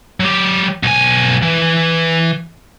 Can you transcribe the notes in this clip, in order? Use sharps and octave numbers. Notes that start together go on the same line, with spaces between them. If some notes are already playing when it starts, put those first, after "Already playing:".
F#3 G4
B1 G#5
E3